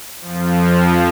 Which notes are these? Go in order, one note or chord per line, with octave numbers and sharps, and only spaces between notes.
F2 F3